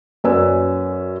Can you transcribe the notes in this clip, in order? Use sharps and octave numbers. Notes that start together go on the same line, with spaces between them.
F#2 C#4 B4 D5 G#5 E6